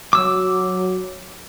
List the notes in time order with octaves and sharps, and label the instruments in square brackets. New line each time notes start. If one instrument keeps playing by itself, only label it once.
[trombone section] F#3 [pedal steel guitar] D6 E6